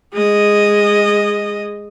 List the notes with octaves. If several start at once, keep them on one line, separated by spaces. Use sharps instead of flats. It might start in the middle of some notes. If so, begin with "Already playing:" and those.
G#3 D#5